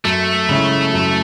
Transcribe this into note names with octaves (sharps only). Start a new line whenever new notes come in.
F#2 A3
C#3 G#3 C#4 E4
F#2